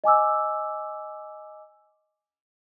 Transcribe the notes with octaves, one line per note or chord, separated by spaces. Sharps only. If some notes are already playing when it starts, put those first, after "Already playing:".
D#5 G#5 D6 E6